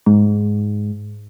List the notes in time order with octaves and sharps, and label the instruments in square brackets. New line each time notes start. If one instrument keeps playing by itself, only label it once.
[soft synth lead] G#2